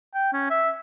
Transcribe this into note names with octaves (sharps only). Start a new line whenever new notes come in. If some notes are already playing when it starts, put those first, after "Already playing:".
G5
C#4
E5